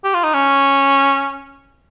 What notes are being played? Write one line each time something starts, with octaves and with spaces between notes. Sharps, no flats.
G4
F4
D#4
C#4